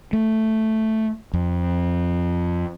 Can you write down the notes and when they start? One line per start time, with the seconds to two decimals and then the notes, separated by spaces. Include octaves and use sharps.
0.13 A3
1.34 F2